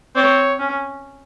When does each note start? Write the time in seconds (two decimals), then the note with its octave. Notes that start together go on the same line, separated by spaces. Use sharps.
0.16 C4 C#5
0.59 C#4